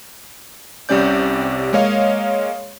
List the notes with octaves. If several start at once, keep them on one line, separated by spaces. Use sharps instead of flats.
C2 C3 G3 C#4 D5 G6
G#3 A#3 C#5 D#5 F5